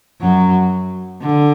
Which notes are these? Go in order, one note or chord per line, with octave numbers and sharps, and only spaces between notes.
F#2 F#3
D3